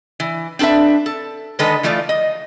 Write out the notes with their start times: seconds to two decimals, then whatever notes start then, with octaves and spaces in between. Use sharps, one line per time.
0.20 E3
0.59 C4 D4 A4 B4 E5
1.06 A4
1.59 D3 D#3 G#3 A4 B4 D#5
1.83 E3 F3 A3 F4 D5
2.09 D#5